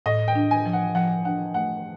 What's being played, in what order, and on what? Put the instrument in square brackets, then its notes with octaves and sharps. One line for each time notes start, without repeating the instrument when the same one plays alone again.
[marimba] A2 [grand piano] D#5
[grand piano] G5
[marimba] D4
[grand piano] G#5
[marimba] F3
[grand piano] F#5
[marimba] F3 [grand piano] F#5
[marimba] D4 [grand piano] F#5
[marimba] A3 [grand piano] F#5